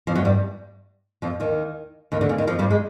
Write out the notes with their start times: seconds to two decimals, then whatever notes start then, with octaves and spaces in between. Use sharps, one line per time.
0.07 F2 F3
0.15 F#2 F#3
0.25 G2 G3
1.22 F2 F3
1.40 D#2 D#3
2.12 D#2 D#3
2.21 D2 D3
2.29 C#3
2.38 D#2 D#3
2.47 F2 F3
2.59 G2 G3
2.71 G#3